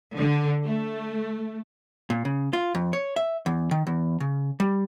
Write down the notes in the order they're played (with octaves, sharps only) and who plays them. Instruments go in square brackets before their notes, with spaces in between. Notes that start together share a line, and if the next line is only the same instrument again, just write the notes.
[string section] D3
A3
[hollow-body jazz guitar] A#2
C#3
F4
F2
C#5
E5
E2
D#3
E2
C#3
G3